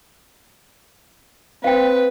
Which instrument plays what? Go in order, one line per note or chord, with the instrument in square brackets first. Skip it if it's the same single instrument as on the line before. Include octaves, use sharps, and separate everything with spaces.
[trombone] C4 [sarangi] B4 [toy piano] F5 G5